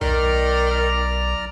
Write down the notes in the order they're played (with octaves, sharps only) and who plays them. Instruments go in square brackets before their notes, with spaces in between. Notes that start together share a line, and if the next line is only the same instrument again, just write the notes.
[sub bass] B1 [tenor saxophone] D#3 [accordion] D5 A#5 F6